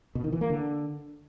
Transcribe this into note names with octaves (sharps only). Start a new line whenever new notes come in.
B2
D#3
E3
A#3
D3